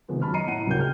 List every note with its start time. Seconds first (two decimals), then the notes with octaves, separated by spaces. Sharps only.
0.08 C3 D#3 F3 G#3 B3
0.22 F#2 C#4 A5 B5 F6
0.34 D#5 A#5 C7 C#7 D#7
0.47 A2 F#5 D#7
0.66 D2 G2 C#3 A#4 G5 G6
0.79 G#4 F6